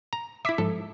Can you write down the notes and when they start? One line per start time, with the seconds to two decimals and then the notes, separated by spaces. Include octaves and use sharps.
0.13 A#5
0.45 E4 E5 D6 B6
0.58 G#2 F3 A4